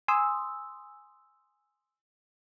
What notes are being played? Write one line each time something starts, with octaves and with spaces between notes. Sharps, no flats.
G#5 C6 D#6 E6